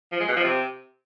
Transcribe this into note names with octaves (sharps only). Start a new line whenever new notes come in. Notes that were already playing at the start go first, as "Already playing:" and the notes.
F3
G#3
B2
F3
C3